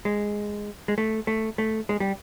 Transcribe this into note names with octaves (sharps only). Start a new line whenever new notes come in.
G#3
G#3
A3
A3
A3
G#3
G3